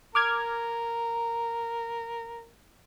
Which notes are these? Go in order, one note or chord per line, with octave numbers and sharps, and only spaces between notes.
A#4 D6 F6 G#6